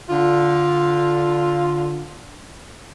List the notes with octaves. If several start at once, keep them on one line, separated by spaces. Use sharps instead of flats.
D3 F4